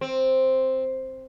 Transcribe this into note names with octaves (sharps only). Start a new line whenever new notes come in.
C4